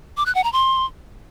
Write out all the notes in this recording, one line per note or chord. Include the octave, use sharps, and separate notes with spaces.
D6
F#6
F#5
A#5
C6